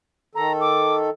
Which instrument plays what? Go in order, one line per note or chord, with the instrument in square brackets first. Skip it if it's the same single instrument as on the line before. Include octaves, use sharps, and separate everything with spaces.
[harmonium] D#3 A4 [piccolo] A#5
[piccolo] D6